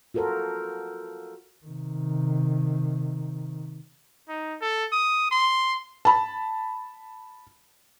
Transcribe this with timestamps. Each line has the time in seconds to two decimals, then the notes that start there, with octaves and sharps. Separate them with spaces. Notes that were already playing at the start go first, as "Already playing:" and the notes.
0.14 F4 F#4 A4 A#4 C5
1.66 C3 D#3
4.29 D#4
4.61 A4
4.92 D#6
5.31 C6
6.05 A5 B5